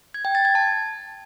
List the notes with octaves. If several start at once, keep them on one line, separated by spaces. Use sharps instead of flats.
G#6
G5
A6
G#6
A5